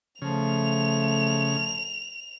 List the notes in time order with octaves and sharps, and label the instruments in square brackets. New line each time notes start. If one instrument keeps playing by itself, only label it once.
[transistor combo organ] C#3 [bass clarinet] F3 [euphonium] A3 [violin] F7